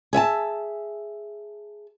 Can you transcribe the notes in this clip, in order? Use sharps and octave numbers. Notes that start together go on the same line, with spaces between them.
G#4 E5 G#5 A5